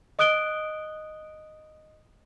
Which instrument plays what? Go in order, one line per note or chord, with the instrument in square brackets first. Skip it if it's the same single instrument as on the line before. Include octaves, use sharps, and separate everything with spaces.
[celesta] D#5 D#6 F#6 D7 G7